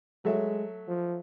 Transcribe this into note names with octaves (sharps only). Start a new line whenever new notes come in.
F#3 G#3 A3 E5
F3